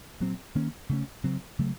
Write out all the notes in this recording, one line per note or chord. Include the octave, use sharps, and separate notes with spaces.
A#2 F#3 C4
D#3 A#3 C#4
C#3 A3 C#4
C#3 F#3 C4
C#3 F#3 A3